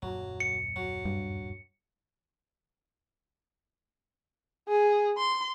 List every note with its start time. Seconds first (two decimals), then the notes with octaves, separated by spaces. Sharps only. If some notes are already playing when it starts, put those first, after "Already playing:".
0.02 D#1 F#2 F#3 A#3
0.40 C#7
0.76 F#3
1.05 G2
4.68 G#4
5.18 C6